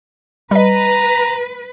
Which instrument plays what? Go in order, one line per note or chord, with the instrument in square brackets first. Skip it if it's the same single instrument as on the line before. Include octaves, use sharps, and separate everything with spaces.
[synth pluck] G3 D#5 [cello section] B4 [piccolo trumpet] A#5